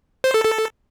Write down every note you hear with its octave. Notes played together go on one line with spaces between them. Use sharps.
C5
A4
A4